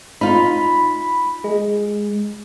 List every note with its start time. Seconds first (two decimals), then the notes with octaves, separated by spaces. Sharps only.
0.21 D#4 F4 B5
1.44 G#3